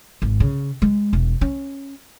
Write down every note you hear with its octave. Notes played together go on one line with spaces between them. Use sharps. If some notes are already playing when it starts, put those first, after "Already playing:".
G#1
C#3
G#3
E1
C#4